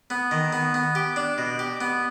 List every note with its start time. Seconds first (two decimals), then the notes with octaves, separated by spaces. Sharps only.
0.10 B3
0.31 D#3
0.53 B3
0.74 B3
0.95 G4
1.16 D4
1.38 B2
1.59 G4
1.81 B3